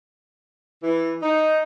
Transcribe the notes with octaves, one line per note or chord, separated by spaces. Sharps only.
E3
D#4